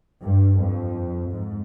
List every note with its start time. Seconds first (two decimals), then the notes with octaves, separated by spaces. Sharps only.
0.21 G2
0.58 F2
1.30 G#2